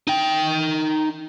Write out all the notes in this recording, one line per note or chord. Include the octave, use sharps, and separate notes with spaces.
D#4 G5